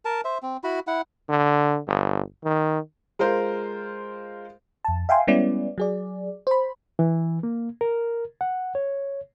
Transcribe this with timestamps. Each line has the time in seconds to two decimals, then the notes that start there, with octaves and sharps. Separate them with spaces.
0.05 A#4 A5
0.25 C5 E5
0.43 C4
0.64 E4 F#4 B5
0.87 E4 F#5
1.29 D3
1.87 G1
2.44 D#3
3.19 G#3 F4 A#4 C5
4.85 F2 A5
5.09 E5 F5 G5 G#5 C6
5.27 G3 G#3 B3 C#4 E4 D5
5.78 F#3 G#4 D5
6.47 C5 B5
6.99 E3
7.43 A#3
7.81 A#4
8.41 F#5
8.75 C#5